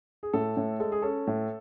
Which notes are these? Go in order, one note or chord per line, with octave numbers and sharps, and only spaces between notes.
G#4
A2 A4
A2
G#3 A4
G#4
C#4 A4
A2